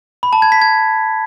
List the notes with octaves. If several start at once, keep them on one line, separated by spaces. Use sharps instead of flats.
B5
A5
G#6
B6
G#6